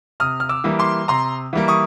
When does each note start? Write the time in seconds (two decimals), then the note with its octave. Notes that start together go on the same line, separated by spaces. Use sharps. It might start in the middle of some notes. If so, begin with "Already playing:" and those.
0.20 C3 D#6 F6
0.40 F6
0.49 D6 E6
0.64 E3 G3 A#3
0.79 C6 D6
1.08 C3 A#5 C6
1.53 E3 G3 A#3
1.68 C#6 D#6